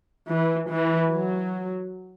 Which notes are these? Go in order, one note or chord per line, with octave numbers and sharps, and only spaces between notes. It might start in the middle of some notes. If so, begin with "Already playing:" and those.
E3
E3
F#3